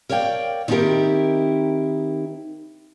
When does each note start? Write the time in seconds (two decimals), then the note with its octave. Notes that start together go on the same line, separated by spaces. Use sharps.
0.09 A#4 C#5 D5 F5 G5
0.68 D#3 C4 D#4 E4 G4 A#4